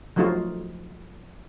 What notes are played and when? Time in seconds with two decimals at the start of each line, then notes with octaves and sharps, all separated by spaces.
0.16 F3 F#3 A3 D#4 F4 F#4